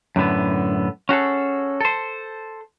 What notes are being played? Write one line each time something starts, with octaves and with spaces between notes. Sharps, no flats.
F#2 A2 D3 B3
C#4 F#4 G#4 A4
A4 C5